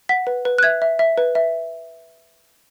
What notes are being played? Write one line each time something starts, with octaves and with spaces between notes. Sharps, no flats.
F#5 B6
B4
B4
F#6
E5 G#6
E5
E5
B4
E5